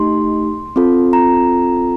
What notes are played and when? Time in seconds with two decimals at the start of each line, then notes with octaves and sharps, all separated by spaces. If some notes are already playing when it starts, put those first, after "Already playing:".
Already playing: A3 D#4 G4 C6
0.76 C4 F4 A4
1.13 A#5